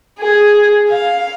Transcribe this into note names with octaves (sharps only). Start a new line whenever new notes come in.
G#4
F5